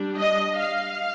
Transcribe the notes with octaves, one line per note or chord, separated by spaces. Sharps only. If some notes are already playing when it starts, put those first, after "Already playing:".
Already playing: G3 D4
D#5
F5